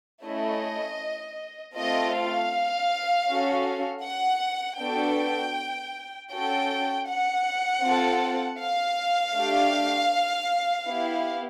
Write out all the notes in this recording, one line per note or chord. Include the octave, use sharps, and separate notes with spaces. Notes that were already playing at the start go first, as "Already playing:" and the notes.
A3 C#4 E4 D#5
A3 C4 F4 A4 D#5
F5
C#4 F#4 A4
F#5
B3 D4 F#4 A4 G5
C#4 F#4 A4 G5
F#5
C4 F4 A4
F5
A3 D4 G4
B3 E4 G4